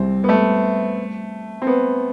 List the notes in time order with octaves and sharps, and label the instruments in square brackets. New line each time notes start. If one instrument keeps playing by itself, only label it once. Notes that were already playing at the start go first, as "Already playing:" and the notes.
Already playing: [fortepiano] C2 [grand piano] C4
[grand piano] B3
A3
C4
B3